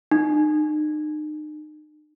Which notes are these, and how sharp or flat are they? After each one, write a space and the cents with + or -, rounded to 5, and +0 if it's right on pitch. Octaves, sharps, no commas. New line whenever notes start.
D#4 -40